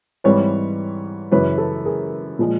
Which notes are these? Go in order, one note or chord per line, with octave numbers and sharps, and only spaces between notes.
G#2 E3 G3 C4 B4 C#5
F#2 C#3 E3 B4 C#5
A4 B4
G#4 A#4
A#2 F3 G#3